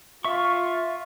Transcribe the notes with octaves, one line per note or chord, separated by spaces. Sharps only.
F4 E5 C#6